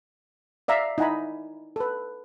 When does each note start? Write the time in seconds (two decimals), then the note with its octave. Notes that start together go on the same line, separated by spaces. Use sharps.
0.68 D5 E5 F5 A#5
0.98 D#4 E4 F#5 G#5 A#5 B5
1.76 A4 B4